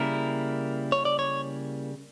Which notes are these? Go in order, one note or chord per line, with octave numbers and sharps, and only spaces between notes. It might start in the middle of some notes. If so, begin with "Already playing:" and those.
Already playing: C#3 G3 A#3 E4 A#4
C#5
D5
C#5